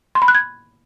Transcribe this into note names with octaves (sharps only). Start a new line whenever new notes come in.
C6
B5
F#6
G#6